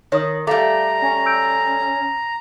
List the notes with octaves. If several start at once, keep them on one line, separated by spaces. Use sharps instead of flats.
D#3 C#5 D#6
G3 A3 F5 A#5 D6
C#4 G#5 A#6
E6 G6 D7